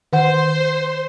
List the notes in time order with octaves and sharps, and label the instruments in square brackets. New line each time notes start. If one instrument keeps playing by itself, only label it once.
[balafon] D#3 F#5 [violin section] C5 C6